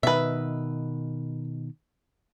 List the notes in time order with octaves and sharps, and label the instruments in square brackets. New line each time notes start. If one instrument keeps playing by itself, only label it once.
[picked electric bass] B2 D#3 [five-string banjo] B4 E5